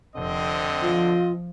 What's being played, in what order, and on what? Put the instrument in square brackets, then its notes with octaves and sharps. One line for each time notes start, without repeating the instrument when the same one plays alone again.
[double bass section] F1 [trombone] D3 [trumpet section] C4 D#5
[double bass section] F3 [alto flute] F4